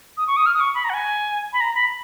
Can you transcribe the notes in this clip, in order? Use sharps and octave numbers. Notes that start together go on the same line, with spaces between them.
D#6
C#6
D#6
F6
D#6
C#6
B5
A#5
F#5
G#5
B5
A#5
B5